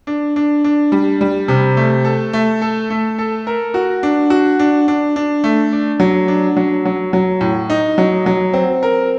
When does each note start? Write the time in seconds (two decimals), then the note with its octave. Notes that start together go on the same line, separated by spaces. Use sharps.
0.07 D4
0.36 D4
0.64 D4
0.92 G3
1.21 G3
1.48 C3
1.77 A3
2.05 A4
2.33 A3
2.62 A4
2.90 A3
3.19 A4
3.47 A#4
3.74 F#4
4.03 D4
4.30 F#4
4.59 D4
4.88 D4
5.16 D4
5.44 A3
5.73 D4
6.00 F#3
6.28 D4
6.56 F#3
6.85 F#3
7.13 F#3
7.41 A2
7.70 D#4
7.98 F#3
8.26 F#3
8.53 C4
8.83 A#4